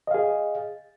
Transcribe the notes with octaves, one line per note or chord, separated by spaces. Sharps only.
G#4 D#5 F5